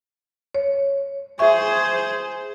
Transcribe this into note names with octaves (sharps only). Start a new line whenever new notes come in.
C#5
G#4 C5 E5 C#6